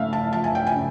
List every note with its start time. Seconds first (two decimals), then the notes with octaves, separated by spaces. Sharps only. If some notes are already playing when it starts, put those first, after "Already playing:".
Already playing: C#3 A3 E5 F5
0.13 A5
0.32 F3 A5
0.44 G#5
0.55 G5
0.67 G#5
0.72 C#3